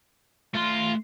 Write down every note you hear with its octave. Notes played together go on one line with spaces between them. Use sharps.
A3 F4 C6